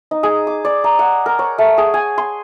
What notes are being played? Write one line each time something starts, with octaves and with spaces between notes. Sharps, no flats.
D#4
G#4
D6
D5
A#5
F#5
A#4
C#5
A3
G#4
G#5
C6